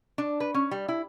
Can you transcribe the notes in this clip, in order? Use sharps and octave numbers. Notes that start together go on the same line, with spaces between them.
D4
B4
C#4
G3
E4